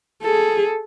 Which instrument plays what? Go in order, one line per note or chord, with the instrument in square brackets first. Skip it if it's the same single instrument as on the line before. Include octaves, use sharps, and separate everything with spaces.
[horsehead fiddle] G#4 A4